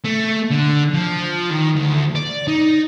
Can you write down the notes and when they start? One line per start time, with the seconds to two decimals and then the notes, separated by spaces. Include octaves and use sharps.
0.05 A3
0.50 D3
0.94 F3
1.51 D#3
1.76 D2
2.16 D5
2.48 D#4